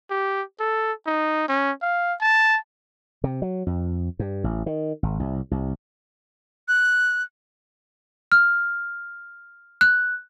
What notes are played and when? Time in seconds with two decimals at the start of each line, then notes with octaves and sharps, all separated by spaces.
0.11 G4
0.60 A4
1.07 D#4
1.49 C#4
1.82 F5
2.21 A5
3.24 C3
3.42 F#3
3.67 F2
4.19 G2
4.44 A1
4.66 D#3
5.03 G#1
5.20 C2
5.51 C2
6.68 F#6
8.32 F6
9.81 F#6